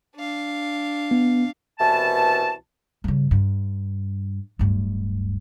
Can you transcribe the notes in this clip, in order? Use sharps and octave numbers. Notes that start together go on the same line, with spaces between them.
D4 F5
B3
C2 B2 E3 A5
G2 C#3
G2
D1 G2